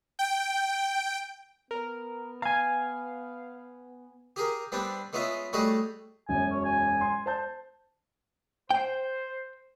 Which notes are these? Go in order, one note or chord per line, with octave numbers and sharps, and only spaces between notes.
G5
B3 A#4
F5 G#5 A#5
G4 G#4 A#4
G3 B3 C4 D4
G#3 B3 C#4 F4 E5
G3 A3 F#4 G#4 C#5 D#5
E1 F#2 G#5
C#5
G#5
C6
C5 A5 G6
C5 G5